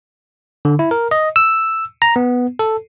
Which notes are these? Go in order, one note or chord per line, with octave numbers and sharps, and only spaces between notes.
D3
E4
A#4
D#5
E6
A#5
B3
A4